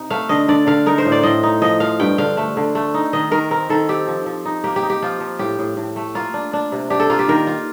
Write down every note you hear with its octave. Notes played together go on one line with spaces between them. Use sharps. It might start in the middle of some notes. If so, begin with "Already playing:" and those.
Already playing: C3 D#4
A3 F5
D3 D#5
D3 D5
D3 F5
D#4 A#4
C5
A2
D5
A2 D#5
D#4
F3 D#5
F3 F5
G2 G5
D3 F5
A3
D3
A3
D#4
D#3 D#5
D#3 A#4
C4 A#4
D#3 A4
C4 G4
F3
F3
D#4
A#3 G4
G4
D#4
G4
F3 F4
F3
A2 G4
A2
A2
A3
A#3 F4
D4
D4
C3
D4 G4
A4
A#3 F4
G4
D#3 A#4
F4